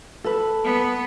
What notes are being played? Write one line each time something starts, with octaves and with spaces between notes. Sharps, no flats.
A4 B4
B3